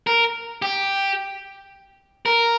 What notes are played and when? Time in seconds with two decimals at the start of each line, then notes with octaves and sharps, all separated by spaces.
0.07 A#4
0.62 G4
2.26 A#4